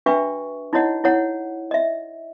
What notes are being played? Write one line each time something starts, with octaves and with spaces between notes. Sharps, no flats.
D4 F#4 B4 E5 G5 C#6
D#4 E4 F#4 C#5 D#5 F#5
E4 C#5 F#5
D#5 E5